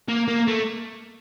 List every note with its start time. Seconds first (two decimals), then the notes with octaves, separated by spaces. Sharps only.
0.09 A#3
0.28 A#3
0.48 A3